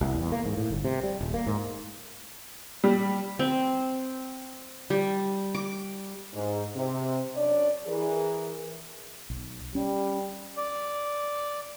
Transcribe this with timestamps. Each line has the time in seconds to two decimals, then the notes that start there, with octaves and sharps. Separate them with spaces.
0.01 C2
0.15 E2
0.32 A#3
0.46 G#2
0.57 A2
0.70 G1
0.85 C3
1.03 G3
1.21 D#1
1.34 A#3
1.46 G#2
2.84 G3
3.39 C4
4.90 G3
5.55 D6
6.33 G#2
6.75 C3
7.36 F#2 D4 C#5 D5
7.86 E3 G#4 A#4
9.30 B1
9.75 G3 C#4
10.57 D5